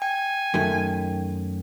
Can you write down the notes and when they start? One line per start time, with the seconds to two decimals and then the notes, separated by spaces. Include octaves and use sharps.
0.02 G5 G#5
0.54 F#2 D#3 A3